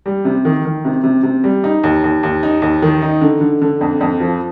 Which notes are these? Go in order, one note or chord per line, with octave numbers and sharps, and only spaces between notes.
G3
C3
D#3
D#3
C3
C3
C3
G3
D#4
D#2
D#2
D#2
D#4
D#2
D#3
D#4
D3
D3
D3
F2
F2
F3